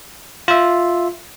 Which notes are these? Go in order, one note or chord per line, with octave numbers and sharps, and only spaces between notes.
F4 E5